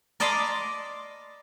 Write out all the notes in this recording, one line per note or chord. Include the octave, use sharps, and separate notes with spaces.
A#4 D5 D#5 A5 B5 C6